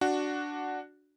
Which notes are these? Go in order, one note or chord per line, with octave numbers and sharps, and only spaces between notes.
D4 F#4